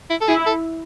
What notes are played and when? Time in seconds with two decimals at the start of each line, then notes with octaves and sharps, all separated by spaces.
0.10 E4
0.21 A4
0.28 E4 G#4
0.47 A4